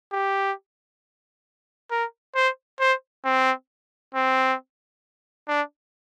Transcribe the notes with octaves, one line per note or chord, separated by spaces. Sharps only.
G4
A#4
C5
C5
C4
C4
D4